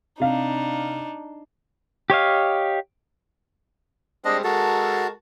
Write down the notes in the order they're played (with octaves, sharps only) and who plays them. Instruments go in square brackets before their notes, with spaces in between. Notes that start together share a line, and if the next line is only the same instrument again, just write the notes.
[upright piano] C3 F5 [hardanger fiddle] D4 D#4
[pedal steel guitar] G4 C#5 D#5 F5
[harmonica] G3 G#3 C4 [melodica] D4 D#5
[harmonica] G#3 A4 A#4 [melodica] F#4 A5